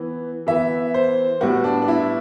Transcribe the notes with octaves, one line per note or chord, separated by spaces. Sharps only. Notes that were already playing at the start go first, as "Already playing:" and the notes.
Already playing: E3 B3
E3 B3 E5
C5
A2 G3 B3 F#4
D4
D4
E4